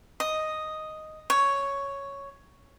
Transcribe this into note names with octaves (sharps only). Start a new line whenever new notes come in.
D#5
C#5